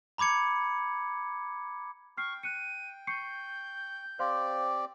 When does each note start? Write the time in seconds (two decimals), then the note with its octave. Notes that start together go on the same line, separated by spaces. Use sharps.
0.18 A#5 B5 D6 G#6 C#7
2.17 G5 C#6 F6 C7
2.43 F#6 C#7 D#7
3.07 C#6 G6 C7 C#7
4.19 C4 G4 C5 D5 F5 C6